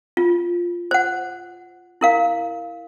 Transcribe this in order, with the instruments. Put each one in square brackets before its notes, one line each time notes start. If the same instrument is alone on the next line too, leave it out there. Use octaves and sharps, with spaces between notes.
[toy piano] F4
C5 F#5
E4 A#4 F5